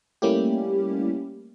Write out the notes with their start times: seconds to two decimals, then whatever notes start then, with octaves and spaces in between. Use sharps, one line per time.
0.22 G3 A3 A#3 C#4 E4 G4